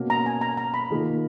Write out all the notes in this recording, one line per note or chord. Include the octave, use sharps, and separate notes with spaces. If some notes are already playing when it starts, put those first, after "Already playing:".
Already playing: B2 A#3 C#4 F#4
A#5
G#5
A#5
A#5
B5
D#3 A#3 F4 G#4